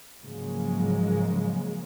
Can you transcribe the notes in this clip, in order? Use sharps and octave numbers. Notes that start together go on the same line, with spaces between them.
G#2 C#3 F3 F#3 G#3 A#3